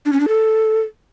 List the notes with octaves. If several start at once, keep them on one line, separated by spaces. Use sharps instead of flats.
D4
C#4
D4
A4